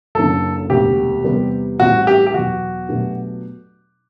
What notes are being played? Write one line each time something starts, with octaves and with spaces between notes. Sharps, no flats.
F#1 F#2 D3 A4
E1 D2 C3 G4
E2 C3 G3 B3
A1 A2 G3 C4 E4 F#4
G4
G4
E2 B2 F#3 F#4
B2 F#3 A3 D4 G4